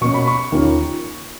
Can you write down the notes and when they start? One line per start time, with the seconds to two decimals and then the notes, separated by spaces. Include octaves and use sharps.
0.01 B2 A#3 C#4 C#6
0.14 B5
0.27 C#6
0.52 D#2 D#3 A#3 C#4 F4